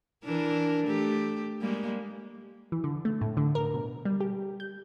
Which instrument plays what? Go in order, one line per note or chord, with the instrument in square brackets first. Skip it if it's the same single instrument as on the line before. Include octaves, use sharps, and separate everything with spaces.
[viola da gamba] E3 D4 A#4
A3 G4
G3 G#3 A#3
[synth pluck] E3
D3
A3
A2
D3
A#4
B2
G3
G4
G6